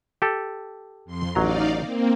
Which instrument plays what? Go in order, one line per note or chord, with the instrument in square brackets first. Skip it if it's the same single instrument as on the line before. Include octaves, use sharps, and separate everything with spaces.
[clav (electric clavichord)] G4 A4
[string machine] F2 C6
[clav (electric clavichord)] A1 F#3 A#5 [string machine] D#4 D5 F5
[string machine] A#3 C4